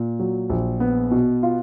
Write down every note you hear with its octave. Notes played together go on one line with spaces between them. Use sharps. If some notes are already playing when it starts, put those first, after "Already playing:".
Already playing: A#2
F#3
A#1
B3
B2
F4